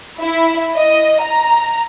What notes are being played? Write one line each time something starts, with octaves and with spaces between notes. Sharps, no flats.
E4
D#5
A#5